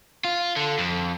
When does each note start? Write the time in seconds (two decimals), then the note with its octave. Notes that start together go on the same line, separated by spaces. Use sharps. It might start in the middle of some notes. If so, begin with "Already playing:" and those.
0.24 F4
0.56 D3
0.79 F2